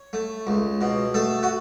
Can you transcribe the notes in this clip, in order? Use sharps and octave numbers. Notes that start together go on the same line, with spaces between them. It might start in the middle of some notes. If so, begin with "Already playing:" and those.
Already playing: C#5
A3
C#2
B2
A3 A4
F#4